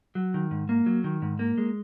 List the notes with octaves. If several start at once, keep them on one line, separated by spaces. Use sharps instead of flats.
F#3
D#3
G#2
A#3
F#3
D#3
G#2
A#3
G#3